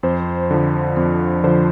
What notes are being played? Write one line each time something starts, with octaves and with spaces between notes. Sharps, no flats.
F2 C5
D3 F3
F2
D3 F3 C5